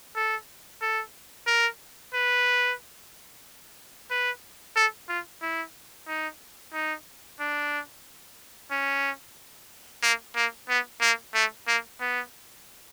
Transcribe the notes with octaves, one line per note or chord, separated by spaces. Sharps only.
A4
A4
A#4
B4
B4
A4
F4
E4
D#4
D#4
D4
C#4
A#3
A#3
B3
A#3
A3
A#3
B3